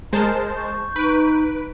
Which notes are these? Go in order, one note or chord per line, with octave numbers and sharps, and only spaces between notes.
G#3 A#4 C5 A5 A#5
C#6 G6
D#4 B4 D7